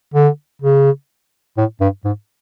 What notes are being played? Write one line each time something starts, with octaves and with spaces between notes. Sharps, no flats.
D3
C#3
A2
G2
G#2